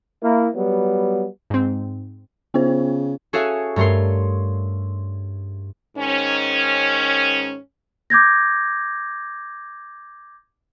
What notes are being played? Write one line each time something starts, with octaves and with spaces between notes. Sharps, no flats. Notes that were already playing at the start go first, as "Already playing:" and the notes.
A#3 E4
F#3 G3 B3
G#2 C4
C#3 B3 F4 C5
C#4 F#4 G#4 A4 E5 F5
G2 A3 A#4 C#5 C6
G#2 D#3 C#4
D6 G6 G#6 A#6